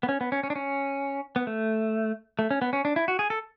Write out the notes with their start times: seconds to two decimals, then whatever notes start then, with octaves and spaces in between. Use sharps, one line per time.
0.03 B3
0.09 C#4
0.21 B3
0.32 C#4
0.43 C#4
0.50 D4
0.56 C#4
1.36 B3
1.47 A3
2.39 A3
2.51 C#4
2.62 B3
2.73 C#4
2.85 D4
2.96 E4
3.08 F#4
3.19 G#4
3.30 A4